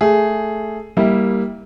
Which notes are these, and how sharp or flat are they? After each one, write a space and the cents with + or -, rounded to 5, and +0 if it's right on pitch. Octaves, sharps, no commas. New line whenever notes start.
A3 +0 G#4 +0
G3 +0 A#3 +0 E4 -25